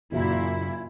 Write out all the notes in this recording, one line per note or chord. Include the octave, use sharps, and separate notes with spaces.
F#1 A#2 E4 F#4 E5